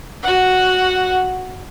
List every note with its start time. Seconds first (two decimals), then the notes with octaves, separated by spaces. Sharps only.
0.23 F#4 F#5